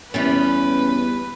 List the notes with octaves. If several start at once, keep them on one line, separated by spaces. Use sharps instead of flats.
E2 G3 B3 C#4 B4